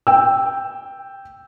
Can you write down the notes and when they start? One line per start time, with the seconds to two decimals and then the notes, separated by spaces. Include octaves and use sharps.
0.07 G5 E6